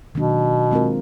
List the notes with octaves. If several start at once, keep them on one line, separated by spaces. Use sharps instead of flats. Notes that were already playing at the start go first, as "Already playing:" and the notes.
B2 D#3 F#3 A#3 D4
G#3 C4 F4 A#4